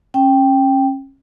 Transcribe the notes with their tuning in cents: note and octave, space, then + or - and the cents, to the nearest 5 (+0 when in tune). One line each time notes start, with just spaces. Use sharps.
C#4 -30 G5 +0